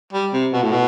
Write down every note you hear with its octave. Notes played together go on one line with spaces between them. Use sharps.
G3
C3
B2
A2
B2